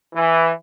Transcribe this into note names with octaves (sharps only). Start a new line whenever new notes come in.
E3